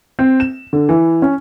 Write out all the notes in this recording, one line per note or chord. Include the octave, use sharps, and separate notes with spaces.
C4
E7
D3
E3
C#4